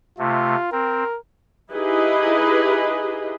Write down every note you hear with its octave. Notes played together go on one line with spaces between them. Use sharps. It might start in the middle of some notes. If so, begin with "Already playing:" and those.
C3 A3 F4
C4 A#4
D#4 E4 G4 G#4 B4 D#5